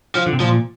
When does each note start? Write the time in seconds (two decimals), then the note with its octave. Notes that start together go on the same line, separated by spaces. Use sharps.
0.15 F3
0.26 D3
0.32 C3
0.40 A#2 F3